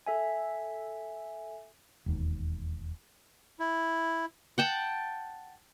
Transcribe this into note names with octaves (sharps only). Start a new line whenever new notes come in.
A4 E5 G#5
E1 D#2
E4
F#5 G5 A5